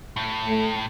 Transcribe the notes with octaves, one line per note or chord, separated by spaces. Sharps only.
A2
A3